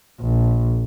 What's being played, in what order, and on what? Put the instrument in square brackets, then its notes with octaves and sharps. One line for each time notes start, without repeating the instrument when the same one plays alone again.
[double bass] A#1